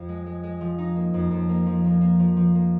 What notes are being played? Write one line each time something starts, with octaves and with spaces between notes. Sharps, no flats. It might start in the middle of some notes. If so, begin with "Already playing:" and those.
Already playing: F2 F4
G#3
G#3
G#3
F3
D#4
A#3
F2
F2
A#3
F3
A#3
A#3
F3
F3
A#3